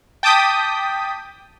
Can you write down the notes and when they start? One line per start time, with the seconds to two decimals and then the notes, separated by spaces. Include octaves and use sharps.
0.23 G5 A5 D6 D#6 G6 B6